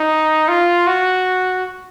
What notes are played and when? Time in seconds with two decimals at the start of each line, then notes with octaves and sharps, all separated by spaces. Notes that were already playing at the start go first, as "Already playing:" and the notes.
Already playing: D#4
0.48 F4
0.87 F#4